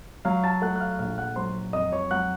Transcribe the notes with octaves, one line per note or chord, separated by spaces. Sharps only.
F#3 F5 F6
A5 A6
A3 F#5 F#6
F#6
F5 F6
F#6
A#1 F5 F6
F#5 F#6
F#3 C5 C6
F2 D#5 D#6
C#5 C#6
F#3 F#5 F#6